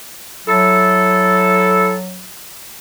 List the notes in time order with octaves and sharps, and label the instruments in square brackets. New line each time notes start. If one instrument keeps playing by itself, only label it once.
[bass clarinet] F#3 [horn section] E4 A4